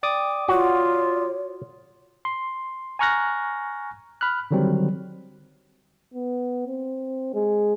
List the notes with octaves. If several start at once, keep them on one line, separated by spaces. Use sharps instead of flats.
D5 G5 D6 D#6
F4 F#4 C#5
C6
G#5 A#5 C#6 F6 F#6 A#6
B5 F6 F#6
D3 D#3 F#3 G3 C4
B3
C4
G#3